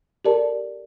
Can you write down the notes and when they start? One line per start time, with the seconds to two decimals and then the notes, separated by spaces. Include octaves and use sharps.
0.25 G4 A4 A#4 D5 A5